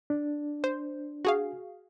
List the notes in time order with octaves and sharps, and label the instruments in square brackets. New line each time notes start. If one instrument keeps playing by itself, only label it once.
[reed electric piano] D4
[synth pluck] C5
F#4 G#4 F5